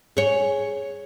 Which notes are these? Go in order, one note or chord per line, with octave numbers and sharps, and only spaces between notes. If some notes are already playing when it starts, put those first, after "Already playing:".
G#4 C#5